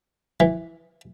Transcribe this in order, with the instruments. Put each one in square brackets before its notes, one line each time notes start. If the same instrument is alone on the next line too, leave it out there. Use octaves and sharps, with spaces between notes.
[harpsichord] E3